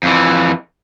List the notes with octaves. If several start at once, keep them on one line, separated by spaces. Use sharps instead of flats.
F2 E3